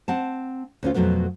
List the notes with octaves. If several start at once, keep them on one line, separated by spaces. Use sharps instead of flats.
C4 F#5 A5
D2 C#4 F4
F2 B2 F#3 A3 B3